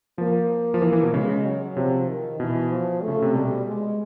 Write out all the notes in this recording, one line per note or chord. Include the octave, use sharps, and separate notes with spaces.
F3 A#3
F3
E3
E3
B2
C#3 G#3
F#3
C3 F3
D#3
B2 E3
F3
C#3 A3
C3
B2 G3
G#3